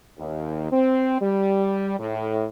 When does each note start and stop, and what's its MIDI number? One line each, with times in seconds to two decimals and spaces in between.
0.19 0.72 39
0.72 1.18 60
1.21 1.96 55
1.99 2.46 45